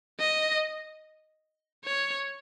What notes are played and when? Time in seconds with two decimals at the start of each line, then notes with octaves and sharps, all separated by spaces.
0.20 D#5
1.85 C#5